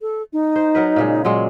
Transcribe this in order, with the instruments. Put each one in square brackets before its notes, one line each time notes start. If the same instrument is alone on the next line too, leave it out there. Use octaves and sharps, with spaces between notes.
[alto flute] A4
D#4
[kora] C5
F#3 A#4 B4
A#2 C#3 G#3
[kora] A#2 F#3 G#3 [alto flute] C6